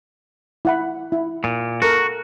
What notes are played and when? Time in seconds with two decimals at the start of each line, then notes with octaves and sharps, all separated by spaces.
0.65 E4 F#5 B5
1.12 E4
1.44 A#2
1.82 F#4 A4 A#4